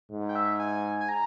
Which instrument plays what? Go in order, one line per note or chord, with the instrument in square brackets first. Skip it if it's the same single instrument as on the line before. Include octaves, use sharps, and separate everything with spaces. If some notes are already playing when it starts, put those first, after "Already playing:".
[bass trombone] G#2
[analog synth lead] G5
E5
G#5
G#5
A#5